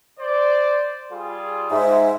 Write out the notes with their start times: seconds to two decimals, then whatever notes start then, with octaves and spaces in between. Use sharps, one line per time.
0.19 C5 D5
1.12 G3 F4 G#4
1.71 G#2 E5